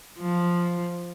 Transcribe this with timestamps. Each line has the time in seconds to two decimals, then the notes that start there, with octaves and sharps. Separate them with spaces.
0.19 F3